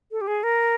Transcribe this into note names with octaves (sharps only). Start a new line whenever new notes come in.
A4
G4
G#4
A#4